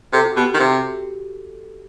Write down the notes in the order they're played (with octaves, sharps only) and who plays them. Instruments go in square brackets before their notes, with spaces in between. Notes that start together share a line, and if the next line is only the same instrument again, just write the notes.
[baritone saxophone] C3 [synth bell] A4
[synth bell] F#4
[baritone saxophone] B2 [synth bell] G4
[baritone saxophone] D#3
C3